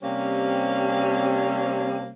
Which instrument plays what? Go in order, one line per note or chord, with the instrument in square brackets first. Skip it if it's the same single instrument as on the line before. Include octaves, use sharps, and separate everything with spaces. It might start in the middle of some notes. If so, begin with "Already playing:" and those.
[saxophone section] C3 G3 A#3 C4 C#4